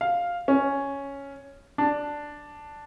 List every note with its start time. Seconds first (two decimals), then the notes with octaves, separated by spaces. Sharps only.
0.01 F5
0.48 C#4
1.78 D4